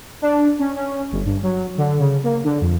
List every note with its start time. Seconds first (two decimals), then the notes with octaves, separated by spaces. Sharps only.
0.22 D4
0.59 C#4
0.76 C#4
1.12 G1
1.25 G2
1.43 F#3
1.78 D3
1.99 C#3
2.24 A#3
2.44 D3
2.61 F2